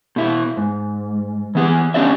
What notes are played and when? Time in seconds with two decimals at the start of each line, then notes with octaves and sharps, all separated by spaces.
0.16 B2 E4
0.57 G#2
1.55 E3 B3 G#4
1.94 B3 C#4 D4 F#4 D5 E5